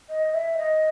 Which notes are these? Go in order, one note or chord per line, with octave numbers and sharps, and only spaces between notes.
D#5
E5
D#5